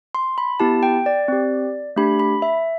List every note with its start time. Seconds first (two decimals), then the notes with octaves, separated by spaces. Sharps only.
0.15 C6
0.38 B5
0.60 B3 E4 G4 A5
0.83 G5
1.06 D5
1.28 C4 G4
1.96 A3 D4 G4 B5
2.19 B5
2.42 E5